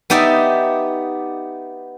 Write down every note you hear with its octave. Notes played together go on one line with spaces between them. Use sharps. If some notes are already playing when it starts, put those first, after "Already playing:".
B3 D#4 G4 D5 E5